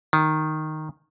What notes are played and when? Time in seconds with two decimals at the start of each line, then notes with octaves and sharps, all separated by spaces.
0.13 D#3